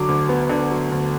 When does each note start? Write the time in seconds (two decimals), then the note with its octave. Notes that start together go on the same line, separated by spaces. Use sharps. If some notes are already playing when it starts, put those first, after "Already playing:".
Already playing: D3 F#3 D6
0.08 D2
0.29 B3
0.49 D3
0.71 F#3
0.92 D2